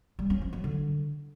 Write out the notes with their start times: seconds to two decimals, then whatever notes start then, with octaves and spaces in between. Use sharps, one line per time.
0.19 G3
0.30 C#4
0.41 F3
0.53 F#3
0.64 D3